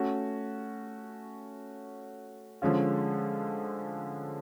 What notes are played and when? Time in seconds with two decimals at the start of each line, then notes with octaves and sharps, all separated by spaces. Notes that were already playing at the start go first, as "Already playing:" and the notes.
Already playing: A3 C#4 F#4
2.62 D3 F3 G#3 C#4 F4